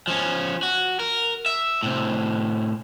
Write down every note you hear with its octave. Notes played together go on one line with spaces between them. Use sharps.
F3 C#4
F#4
A#4
E5
A2 C3